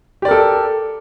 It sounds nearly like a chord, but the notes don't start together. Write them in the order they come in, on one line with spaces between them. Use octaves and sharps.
G4 D5 A#4 A4